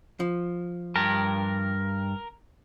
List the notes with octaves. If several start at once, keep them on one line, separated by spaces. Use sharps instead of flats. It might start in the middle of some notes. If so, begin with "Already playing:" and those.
F3
G2 A#4 A5